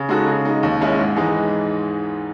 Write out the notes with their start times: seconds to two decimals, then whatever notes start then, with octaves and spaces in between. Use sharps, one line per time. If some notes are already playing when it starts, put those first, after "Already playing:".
Already playing: C#3
0.09 G#3 D#4 F#4 A4
0.26 C#3
0.45 G#3 D#4
0.63 D#2
0.81 D#3 G#3 C#4 E4
0.99 G#2
1.17 E3 G#3 D#4